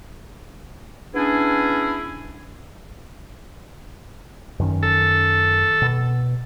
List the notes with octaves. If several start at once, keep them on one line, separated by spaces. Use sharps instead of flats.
B3 C#4 D4 E4 G#4
F#2 D#3 C#4
A4
B2